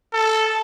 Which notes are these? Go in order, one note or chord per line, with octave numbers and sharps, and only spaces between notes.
A4